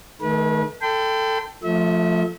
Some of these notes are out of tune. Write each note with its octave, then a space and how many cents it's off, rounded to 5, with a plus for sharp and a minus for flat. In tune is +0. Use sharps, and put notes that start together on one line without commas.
D#3 +0 A3 -35 B4 -40
A4 +15 G5 +0 C6 -45
F3 +0 A3 +0 E5 -40